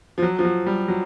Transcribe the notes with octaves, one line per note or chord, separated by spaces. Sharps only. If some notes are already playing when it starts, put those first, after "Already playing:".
F3
F#3
F3
F#3
G3
F#3